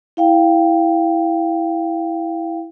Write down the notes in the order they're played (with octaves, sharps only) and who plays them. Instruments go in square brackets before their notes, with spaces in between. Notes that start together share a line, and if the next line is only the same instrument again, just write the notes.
[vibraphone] E4 F5 G5